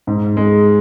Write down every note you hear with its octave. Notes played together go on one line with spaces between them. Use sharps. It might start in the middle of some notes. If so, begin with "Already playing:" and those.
G#2
G#3